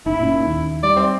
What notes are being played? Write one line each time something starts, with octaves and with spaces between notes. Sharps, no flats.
F#1 D#4 E4
A#2 C#4
D#2
G3 D5
C4 E5